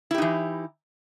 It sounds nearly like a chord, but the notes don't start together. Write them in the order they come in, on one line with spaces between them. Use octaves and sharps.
E4 G4 D#4 E3